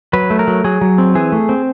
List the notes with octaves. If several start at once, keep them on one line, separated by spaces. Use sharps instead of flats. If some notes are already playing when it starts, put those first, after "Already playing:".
F#3 B4
A3
A#4
F#3
F#3 G#4
F#3
C4
E3 G#4
A3
C4